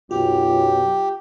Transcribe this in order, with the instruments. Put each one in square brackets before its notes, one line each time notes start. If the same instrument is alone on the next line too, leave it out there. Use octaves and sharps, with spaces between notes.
[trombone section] B1 F#2 [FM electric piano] F4 [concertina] G4